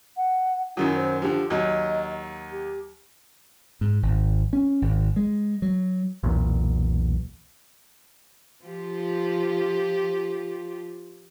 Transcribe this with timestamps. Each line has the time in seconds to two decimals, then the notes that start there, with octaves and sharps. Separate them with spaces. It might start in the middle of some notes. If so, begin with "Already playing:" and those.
0.17 F#5
0.77 F#2 D#3 F#3 E4
0.96 C5
1.22 D3 F3 G4
1.50 D#2 F#3 D#5
2.52 G4
3.81 G#2
4.03 G#1
4.53 C#4
4.82 G#1
5.16 G#3
5.62 F#3
6.23 B1 E2 A#2
8.65 F3 F4 G4